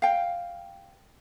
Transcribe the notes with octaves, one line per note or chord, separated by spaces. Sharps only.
F5 G5